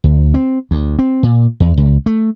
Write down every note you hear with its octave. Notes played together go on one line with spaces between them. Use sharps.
D2
C4
D2
C4
A#2
E2
C#2
A3